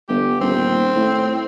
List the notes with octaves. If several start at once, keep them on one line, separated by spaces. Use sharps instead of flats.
G1 G4
D#1 C4
A2